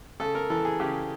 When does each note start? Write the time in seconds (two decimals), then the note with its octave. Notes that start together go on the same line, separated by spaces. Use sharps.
0.20 C#3 A4
0.35 A#4
0.50 E3 A4
0.65 G#4
0.80 C#3 G4